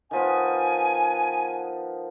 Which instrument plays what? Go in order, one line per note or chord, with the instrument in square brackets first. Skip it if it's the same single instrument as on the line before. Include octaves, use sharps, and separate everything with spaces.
[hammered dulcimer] D#3 F3 B3 [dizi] G#5